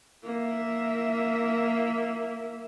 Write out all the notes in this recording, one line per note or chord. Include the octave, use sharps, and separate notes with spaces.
A#3 E5